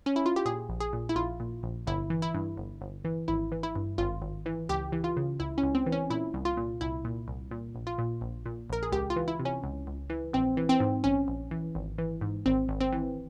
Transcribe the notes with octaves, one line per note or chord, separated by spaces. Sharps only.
C#4
E4
F4
G4
A#2 G#4
A#1
G#4
A#2
E4
A#1 F4
A#2
A#1
G1 E4
E3
E4
G2
G1
G1
E3
G#1 E4
E3
E4
G2
G#1 F4
G#1
E3
C#2 G4
E3
F4
C#3
C#2 E4
C#4
C#2
C4
E3
C#4
A#2 E4
C2
F4
A#2
C2 E4
A#2
C2
A#2
A#1
F4
A#2
A#1
A#2
A#1 A#4
G#4
C#2 G4
F4
E3
E4
C3
C#4
C#2
C#2
E3
A#1 C4
E3
C4
G#2
A#1 C#4
A#1
E3
G#1
E3
G#2
G#1 C4
G#1
C4
E3